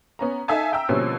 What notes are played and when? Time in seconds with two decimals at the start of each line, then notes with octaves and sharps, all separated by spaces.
0.19 B3 C#4 A#5
0.48 D#4 A4 E5 F5 G#5 A5
0.72 E5 G5 A#5 E6
0.89 B2 D3 F3 G3 A#3 C#4